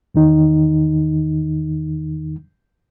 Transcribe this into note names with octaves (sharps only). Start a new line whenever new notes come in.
E2 D#3 D#4